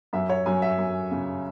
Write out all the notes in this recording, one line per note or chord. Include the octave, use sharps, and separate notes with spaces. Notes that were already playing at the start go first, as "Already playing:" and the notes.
F#2 E5
C#5
F#2 G#5
E5
F#2
C#3